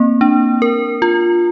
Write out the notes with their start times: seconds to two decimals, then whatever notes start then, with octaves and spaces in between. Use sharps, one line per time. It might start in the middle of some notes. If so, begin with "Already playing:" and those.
Already playing: A#3 C4
0.21 D4
0.62 A#4
1.02 F4